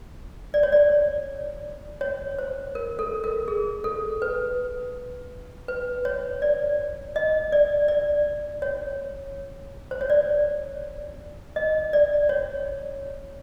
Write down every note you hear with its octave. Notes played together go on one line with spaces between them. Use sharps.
D5
C#5
D5
C#5
C5
A#4
A4
A#4
G#4
A4
B4
B4
C#5
D5
D#5
D5
D5
C#5
C5
C#5
D5
D#5
D5
C#5